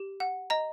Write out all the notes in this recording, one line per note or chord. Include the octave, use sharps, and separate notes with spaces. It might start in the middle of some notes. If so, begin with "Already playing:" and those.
Already playing: G4
F#5
D#5 A#5